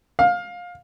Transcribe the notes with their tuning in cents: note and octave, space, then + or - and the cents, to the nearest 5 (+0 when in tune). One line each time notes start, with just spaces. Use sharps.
F5 +20